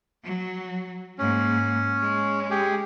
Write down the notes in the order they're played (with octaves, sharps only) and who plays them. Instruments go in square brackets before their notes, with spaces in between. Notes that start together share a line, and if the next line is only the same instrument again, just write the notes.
[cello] F#3
[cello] G#2 A#3 [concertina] C#4
[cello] G#3
[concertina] G4 G#4